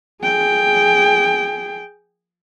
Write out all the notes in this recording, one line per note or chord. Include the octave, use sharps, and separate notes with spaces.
G#4 G5